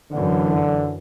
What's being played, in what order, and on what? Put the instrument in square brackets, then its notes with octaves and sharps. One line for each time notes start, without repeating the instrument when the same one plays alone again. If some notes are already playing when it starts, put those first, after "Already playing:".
[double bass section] F#2 E3 [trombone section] D3